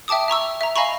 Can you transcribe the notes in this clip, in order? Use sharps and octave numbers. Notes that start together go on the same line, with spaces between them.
E5 G5 A5 D6 D#6
E5 A#5 C#6 E6
E5 A#5
D#5 F5 G#5 A#5 B5 C#6